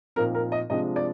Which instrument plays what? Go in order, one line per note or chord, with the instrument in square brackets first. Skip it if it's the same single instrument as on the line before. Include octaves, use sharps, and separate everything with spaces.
[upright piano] A#2 F3 C4 D#4 A#4
A#4
D#5
C3 F3 G#3 D4 D#5
D5